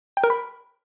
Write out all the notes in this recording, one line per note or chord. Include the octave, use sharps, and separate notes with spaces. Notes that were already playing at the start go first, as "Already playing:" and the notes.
G5
A#4
B5